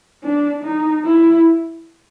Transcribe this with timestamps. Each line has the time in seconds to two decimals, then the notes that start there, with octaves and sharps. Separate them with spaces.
0.23 D4
0.64 D#4
1.05 E4